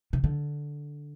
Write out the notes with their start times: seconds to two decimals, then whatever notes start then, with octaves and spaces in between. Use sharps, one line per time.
0.13 C3
0.24 D3